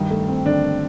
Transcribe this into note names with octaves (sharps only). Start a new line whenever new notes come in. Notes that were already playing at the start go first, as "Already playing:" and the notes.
Already playing: G2 D#3
A3
C4
D3 D4